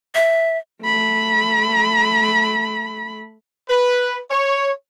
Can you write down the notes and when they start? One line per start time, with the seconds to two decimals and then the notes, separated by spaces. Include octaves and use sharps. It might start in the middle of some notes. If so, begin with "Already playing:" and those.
0.15 E5
0.84 A3 B5
3.68 B4
4.31 C#5